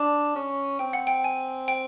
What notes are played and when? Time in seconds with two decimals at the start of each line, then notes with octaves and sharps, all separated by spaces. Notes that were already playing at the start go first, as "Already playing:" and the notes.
Already playing: D4
0.35 C#4
0.79 C4 G5
0.93 F#5
1.07 G5
1.24 G#5
1.68 G5